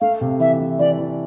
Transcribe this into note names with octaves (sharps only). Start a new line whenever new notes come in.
A3 F5
C3
E3 E5
E3
E3 D5
E3